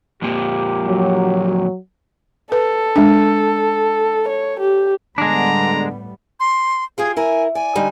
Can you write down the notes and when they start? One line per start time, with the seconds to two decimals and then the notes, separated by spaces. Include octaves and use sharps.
0.22 F2 A#2 F3 A#3 G4
0.87 F#3
2.52 A4 B4
2.96 G#3 D4
4.28 C#5
4.60 G4
5.18 A2 D3 G3 G#3 B3 D4 A#5
6.40 C6
6.98 F4 G4 G#4 G#5
7.16 E4 A#4 G#5
7.55 D5 G#5
7.75 D3 G3 D#4